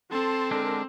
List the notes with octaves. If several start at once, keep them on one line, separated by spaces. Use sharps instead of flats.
C4 A4 A5 C6
D3 G#3 D4 A#4